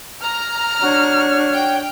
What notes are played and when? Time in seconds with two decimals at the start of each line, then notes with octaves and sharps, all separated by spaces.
0.22 A#5 F6
0.82 D4 F#4 C#5
1.53 G5